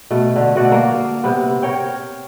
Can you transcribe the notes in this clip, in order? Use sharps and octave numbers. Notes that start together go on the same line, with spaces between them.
B2 A3 A4
D3
B2 A3 F#4 D5
A#3
C3 B3
A#4 C#5 G5